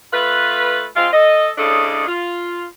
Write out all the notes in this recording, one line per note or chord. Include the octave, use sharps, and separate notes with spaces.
A3 F4 B4
G#3 C4 F4
A4 D#5
A2 C#3 D4 A4 D#5
F4